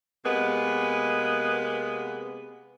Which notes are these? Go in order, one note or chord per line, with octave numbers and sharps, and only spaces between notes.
C3 G#3 A#3 B3